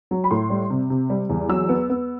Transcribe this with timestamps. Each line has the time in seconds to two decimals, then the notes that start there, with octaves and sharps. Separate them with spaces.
0.11 F#3
0.24 B5
0.31 A2 C6
0.50 G3
0.70 C3
0.90 C3
1.10 G3
1.30 E2
1.49 F#3 E6
1.69 B3
1.90 B3